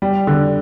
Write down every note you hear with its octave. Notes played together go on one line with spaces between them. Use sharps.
G3
D3